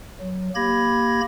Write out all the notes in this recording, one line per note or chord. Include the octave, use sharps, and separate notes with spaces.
F#3
A#3 G4 B5 G#6 A#6